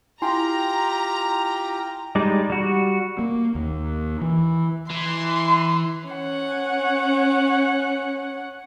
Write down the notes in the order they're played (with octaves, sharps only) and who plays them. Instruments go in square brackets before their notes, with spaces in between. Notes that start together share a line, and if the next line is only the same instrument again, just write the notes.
[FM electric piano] E4 G#5 C6 [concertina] F4 G4 G5 [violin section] A#5
[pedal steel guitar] G3 G#3 D#4 D5
G3 F#4
[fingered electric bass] A#3
D#2
E3
[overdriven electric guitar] E3 [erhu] C6
[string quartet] C#4 F#5